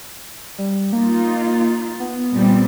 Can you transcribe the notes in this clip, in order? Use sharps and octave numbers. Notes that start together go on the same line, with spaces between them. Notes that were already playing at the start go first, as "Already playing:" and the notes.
G3
A#3 D#4 F4
B3
A#2 G3 C4